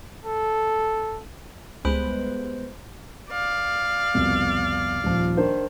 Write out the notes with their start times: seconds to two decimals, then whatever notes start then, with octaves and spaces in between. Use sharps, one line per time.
0.25 A4
1.85 C#2 G3 G#3 B3 B4 C5
3.30 D5 F5
4.14 C2 F2 B2
5.04 D#1 F3
5.37 D#3 D4 A#4 C5